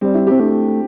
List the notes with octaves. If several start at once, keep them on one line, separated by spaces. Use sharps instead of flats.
G3 C4
E4
C4 G4
A3 D4